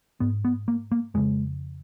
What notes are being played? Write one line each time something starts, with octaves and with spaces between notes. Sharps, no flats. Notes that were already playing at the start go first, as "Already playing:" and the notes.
G#2 B3
B3
A#3
A#3
F2 C#3 G#3